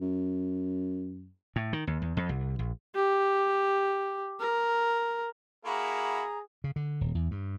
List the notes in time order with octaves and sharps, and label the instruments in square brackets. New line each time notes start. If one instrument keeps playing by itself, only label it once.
[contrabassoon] F#2
[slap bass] A2
D#3
D#2
E2
F2
C2
A#1
[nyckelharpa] G4
A#4
[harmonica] A#3 E4 F#4 [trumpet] G#4 [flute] A#5
[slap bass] C#3
D3
D#1
E2
G2